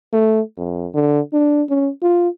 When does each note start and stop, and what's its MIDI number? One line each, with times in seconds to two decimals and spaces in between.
0.13 0.40 57
0.58 0.87 41
0.94 1.20 50
1.33 1.63 62
1.69 1.89 61
2.02 2.28 65